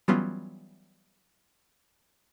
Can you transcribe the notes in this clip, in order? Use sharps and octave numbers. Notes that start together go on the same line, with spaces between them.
E3 F#3 G3 B3 C#4 F4